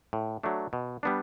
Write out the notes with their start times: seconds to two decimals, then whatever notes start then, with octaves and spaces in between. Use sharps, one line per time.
0.13 A2
0.43 F#3 A3 D4
0.73 B2
1.03 G3 B3 D4